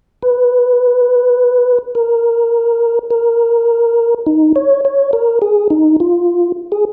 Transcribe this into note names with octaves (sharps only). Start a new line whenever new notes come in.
B4
A#4
A#4
D#4
C#5
C#5
A#4
G#4
D#4
F4
G#4